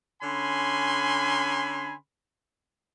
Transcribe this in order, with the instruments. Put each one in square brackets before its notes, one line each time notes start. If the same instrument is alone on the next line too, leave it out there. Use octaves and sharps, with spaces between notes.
[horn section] D3 C#4 G#5 B5 C6